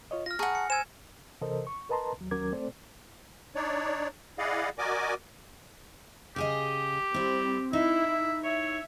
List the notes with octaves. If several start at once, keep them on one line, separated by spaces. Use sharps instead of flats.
F4 C#5 D#5
F4 F6 A#6
G#4 F#5 A5 A#5 C#6
C#7
C5 G#5 E6 G#6 E7
C3 E3 A4 A#4 C5 D#5
C#6
A#4 B4 D#5 A5 A#5 C6
D#2 F#3
D#2 F#3 C#4 A#4 D6 G#6
A3 C4 A4 C5 D5
D4 D#4 C#5 D5
E4 G#4 D5 D#5 F5 F#5
F#4 A#4 D5 D#5 G#5 D6
C#3 G4 G#4 D#5
G3 C4 E4
D#4 E4 E5
C#5 E5